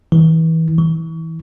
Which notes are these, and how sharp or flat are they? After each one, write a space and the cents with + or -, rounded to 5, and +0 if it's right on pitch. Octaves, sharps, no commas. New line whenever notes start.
E3 -30
E3 -25